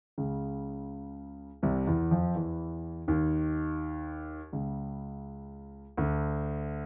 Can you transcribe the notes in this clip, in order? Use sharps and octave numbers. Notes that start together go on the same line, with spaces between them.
C#2 C#3
C2 C3
E2 E3
F2 F3
E2 E3
D#2 D#3
C#2 C#3
D2 D3